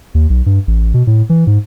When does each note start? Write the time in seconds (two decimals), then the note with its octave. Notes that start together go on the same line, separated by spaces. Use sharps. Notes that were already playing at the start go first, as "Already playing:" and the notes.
0.15 D#2
0.30 B1
0.46 G2
0.67 A1
0.94 B2
1.07 A2
1.29 E3
1.47 G#2